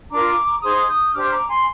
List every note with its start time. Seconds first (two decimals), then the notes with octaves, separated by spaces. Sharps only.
0.10 D4 F4 A#4 A#5 D6
0.62 D#4 G#4 C5 C6 D#6
0.88 D#6 G6
1.14 D4 G4 C5 D6 F6
1.30 A#5 D6
1.48 G#5 C6